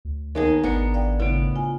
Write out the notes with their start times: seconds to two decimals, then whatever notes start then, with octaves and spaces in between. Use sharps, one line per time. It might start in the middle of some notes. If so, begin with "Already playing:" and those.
0.05 D2
0.35 D#2 B3 D#4 G#4 A#4
0.63 G#1 B3 D4 A#5 C#7
0.94 D5 F5 G5
1.20 A2 C#3 B3 D7
1.56 F4 G#5